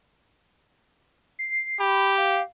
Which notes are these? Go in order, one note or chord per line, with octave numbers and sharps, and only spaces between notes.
C7
G4 B5
F5